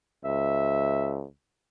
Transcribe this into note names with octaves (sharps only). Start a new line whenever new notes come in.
C#2 E5